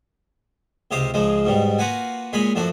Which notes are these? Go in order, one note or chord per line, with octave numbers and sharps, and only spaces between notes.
C#2 C3 G4 C5 F5 D#6
C#2 C#3 F3 G#3
G#2 B2 G3
A#3 F4 F#4 B4 F#5 G#5
A#2 G#3 C#5 G#5 B5
F#2 F3 A3 D4 F#4